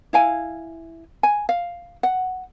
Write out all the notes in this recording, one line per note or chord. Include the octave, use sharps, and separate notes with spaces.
E4 F5 G#5
G#5
F5
F#5